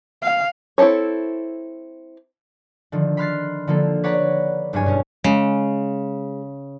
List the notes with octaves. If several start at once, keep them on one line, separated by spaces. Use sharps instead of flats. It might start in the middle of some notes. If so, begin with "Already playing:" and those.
F5
C4 E4 F#4 A4 C#5
D3 D#3 F3
B5 C6 F6 F#6 A6 C7
D3 F3 A#3 A4
B4 C#5 D5 F#5 A#5 B5
F#1 G2 D4 C#5 G#5
B2 C#4 D#4
C#3 G#3